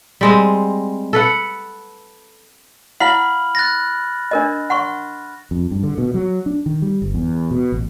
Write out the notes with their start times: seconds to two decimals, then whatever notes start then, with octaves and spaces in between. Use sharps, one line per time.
0.21 G3 G#3 C4
1.13 A4 B4 F#5
3.00 E4 F5 F#5 B5 F6 F#7
3.55 F#6 A6 A#6
4.31 D4 A#4 D#5
4.70 F#5 C6 C#6
5.51 F2
5.71 G2
5.83 D3
5.98 B2
6.14 F#3
6.46 D4
6.66 D#3
6.82 G3
7.02 G1
7.15 E2
7.51 B2
7.72 A1